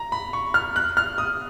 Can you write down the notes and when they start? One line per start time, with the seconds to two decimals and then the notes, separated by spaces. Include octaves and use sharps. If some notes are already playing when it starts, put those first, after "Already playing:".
Already playing: A#5
0.12 B5
0.33 C#6
0.54 F6
0.76 F#6
0.97 F6
1.18 D#6